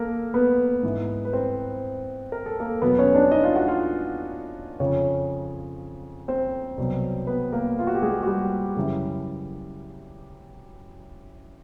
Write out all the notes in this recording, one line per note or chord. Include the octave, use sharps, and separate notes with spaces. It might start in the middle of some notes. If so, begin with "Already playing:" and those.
Already playing: A#3 A4 A#4
B3 B4
G#2 E3
B4
C4 C5
A#4
A4
A#3 A#4
E2 B2 F#3 B3 B4
C#4 C#5
D4 D5
D#4 D#5
F4 F5
F#4 F#5
F4 F5
F2 C#3 F3 C#4 C#5
C4 C5
C2 B2 F#3
B3 B4
A#3 A#4
F4
F#4
G4
G#3 G#4
F#4
G3 G4
F#2 C#3 E3